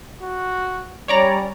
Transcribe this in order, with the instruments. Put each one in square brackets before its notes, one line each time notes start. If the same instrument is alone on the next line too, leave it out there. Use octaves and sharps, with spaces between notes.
[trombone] F#4
[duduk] G3 [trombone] C#4 [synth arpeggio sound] C#5 D5 A#5